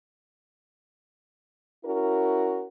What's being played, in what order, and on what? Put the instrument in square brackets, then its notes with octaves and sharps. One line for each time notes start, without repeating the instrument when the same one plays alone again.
[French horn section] C#4 E4 F#4 A#4